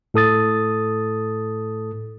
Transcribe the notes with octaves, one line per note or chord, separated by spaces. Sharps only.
A2 A4 D#6 A6